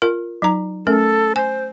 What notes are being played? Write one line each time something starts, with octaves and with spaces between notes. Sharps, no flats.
F4 A#4
F#3 D#4 A#5
A3 C#4 A4 A#4
C5 G#5